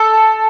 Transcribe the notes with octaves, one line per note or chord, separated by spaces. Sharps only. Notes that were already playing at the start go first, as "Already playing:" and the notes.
Already playing: A4